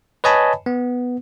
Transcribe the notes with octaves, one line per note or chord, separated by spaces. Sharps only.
B4 C#5 D#5 G#5 A5 B5
B3